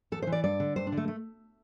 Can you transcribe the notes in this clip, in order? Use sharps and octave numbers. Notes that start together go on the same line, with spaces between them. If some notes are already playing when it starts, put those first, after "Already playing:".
E2 A4
C5
E3
D5
G2 D5
D3
G2 C5
D4
D3
A3
A3